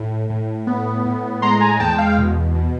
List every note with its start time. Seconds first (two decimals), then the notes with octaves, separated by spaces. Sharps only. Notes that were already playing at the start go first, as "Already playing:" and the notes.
Already playing: A2
0.30 A2
0.67 B3
1.05 A2
1.42 G#3 A#5 C6
1.61 G#5 A#5
1.80 E2 G5 A5
1.98 F5 G5
2.18 B2
2.55 B2